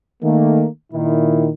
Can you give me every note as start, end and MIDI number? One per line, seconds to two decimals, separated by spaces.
0.23 0.65 51
0.23 0.65 57
0.23 0.65 58
0.93 1.49 46
0.93 1.49 51
0.93 1.49 64